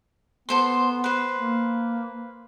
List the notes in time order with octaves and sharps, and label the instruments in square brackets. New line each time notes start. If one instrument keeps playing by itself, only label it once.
[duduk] B3 [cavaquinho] A4 C5 C6
[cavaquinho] B4 C5
[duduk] A#3